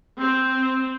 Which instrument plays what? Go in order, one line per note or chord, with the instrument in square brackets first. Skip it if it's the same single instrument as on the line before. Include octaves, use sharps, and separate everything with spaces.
[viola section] C4